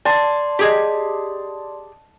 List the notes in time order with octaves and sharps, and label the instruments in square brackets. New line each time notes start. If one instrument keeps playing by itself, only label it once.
[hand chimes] D5 C6 [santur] A5
[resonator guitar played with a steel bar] G4 G#4 [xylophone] D#5 G#6 B6